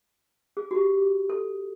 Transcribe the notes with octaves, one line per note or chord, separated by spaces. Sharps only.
G#4
F#4
G4
A4